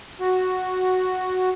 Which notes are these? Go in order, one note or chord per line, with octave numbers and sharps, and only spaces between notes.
F#4